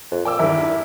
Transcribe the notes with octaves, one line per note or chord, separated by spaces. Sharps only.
F2
A#2 G5 D6 E6
E2 G2 D#3 E4